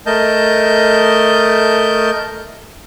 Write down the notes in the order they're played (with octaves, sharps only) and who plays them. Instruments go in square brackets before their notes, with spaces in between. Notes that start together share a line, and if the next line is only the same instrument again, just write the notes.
[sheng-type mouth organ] A3 A#4 D#5 A5 G6